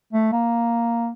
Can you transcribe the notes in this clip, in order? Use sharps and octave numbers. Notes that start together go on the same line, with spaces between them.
A3
A#3